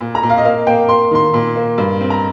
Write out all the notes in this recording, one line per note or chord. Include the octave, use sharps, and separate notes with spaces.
A#2
A#5
A#2
F5
D#5
A#3 F5
A#3 G5
A#3 C6
D#3 C6
A#2
A#3
G2
C4
A#5